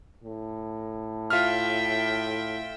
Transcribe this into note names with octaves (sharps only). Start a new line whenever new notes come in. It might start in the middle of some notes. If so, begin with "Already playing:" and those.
A2
F4 E5 G5 F6